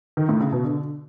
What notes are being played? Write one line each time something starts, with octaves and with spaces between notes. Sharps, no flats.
D#3
A2
C#3
B2
D3